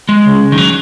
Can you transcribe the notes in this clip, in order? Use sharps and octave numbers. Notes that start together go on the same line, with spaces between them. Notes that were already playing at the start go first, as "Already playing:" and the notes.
G#3
C#3
D#3
F#3